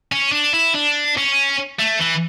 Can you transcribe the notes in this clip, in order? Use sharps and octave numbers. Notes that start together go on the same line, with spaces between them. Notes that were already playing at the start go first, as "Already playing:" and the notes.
C#4
D4
E4
D4
C#4
A3
E3